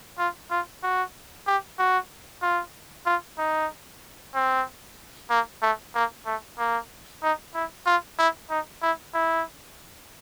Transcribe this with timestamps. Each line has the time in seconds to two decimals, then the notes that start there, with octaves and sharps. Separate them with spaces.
0.19 F4
0.51 F4
0.83 F#4
1.47 G4
1.79 F#4
2.42 F4
3.06 F4
3.38 D#4
4.35 C4
5.30 A#3
5.62 A3
5.95 A#3
6.26 A3
6.58 A#3
7.22 D#4
7.55 E4
7.86 F4
8.18 E4
8.50 D#4
8.82 E4
9.14 E4